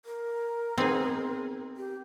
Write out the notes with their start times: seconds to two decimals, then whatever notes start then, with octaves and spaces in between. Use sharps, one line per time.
0.05 A#4
0.78 B3 C4 D#4 G#4
1.77 G4